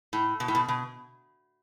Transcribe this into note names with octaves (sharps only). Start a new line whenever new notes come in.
A2
B2
A2
B2
B2